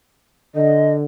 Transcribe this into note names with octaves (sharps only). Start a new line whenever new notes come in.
D3 D#5